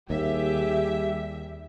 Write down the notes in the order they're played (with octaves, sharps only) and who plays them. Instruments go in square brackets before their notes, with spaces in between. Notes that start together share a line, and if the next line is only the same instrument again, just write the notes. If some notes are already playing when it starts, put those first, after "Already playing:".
[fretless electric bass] D#2 [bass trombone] G3 [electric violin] G4 G#4 [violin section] E5